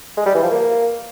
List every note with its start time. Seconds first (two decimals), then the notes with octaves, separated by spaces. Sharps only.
0.17 G#3
0.26 G3
0.34 E3
0.43 F3
0.51 A#3